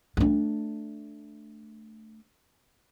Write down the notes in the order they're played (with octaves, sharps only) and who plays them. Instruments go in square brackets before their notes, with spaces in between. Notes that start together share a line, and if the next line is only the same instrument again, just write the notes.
[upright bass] A3 D4